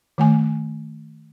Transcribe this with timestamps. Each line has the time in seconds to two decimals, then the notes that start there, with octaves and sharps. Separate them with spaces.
0.18 D#3 A3 G#5